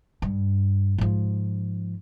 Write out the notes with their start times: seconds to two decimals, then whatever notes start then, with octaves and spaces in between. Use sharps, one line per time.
0.22 G2
0.98 G#2 F3